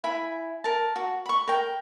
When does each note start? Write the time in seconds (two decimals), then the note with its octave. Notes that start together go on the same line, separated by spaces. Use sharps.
0.04 E4 G#5 B5
0.64 A#4 A5
0.96 F#4
1.26 B5 C#6
1.48 A#4 G5